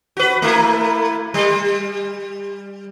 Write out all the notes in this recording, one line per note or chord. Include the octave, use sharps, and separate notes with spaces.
F#4 B4
A3 A#3 E4
G3